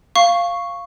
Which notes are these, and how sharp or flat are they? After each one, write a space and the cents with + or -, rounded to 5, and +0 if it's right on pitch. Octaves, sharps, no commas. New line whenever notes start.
F5 -5 C#6 +0